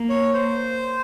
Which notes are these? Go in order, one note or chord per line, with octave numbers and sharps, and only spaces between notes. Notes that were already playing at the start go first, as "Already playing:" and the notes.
Already playing: A#3
C#5
C5